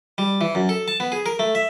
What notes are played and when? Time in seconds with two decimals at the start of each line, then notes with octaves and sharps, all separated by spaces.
0.18 G3
0.41 E3
0.55 F#2
0.69 A4
0.88 A5
1.00 B3
1.12 G#4
1.26 A#4
1.39 A3
1.55 E5